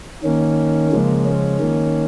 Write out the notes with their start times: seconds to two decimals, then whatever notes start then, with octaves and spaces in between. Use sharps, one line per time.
0.23 D#3 A#3 C#4
0.92 C#3 F3 G#3 A#3
1.25 C#4
1.60 D#3 A#3